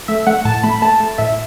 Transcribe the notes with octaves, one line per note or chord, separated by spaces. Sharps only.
A3 E5
A3 F#5
A2 A5
A3 B5
A3 A5
A3
A2 E5